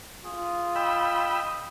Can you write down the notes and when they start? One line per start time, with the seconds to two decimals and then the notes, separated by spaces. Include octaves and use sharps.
0.25 F4 G#4
0.76 D#5 G5 B5 E6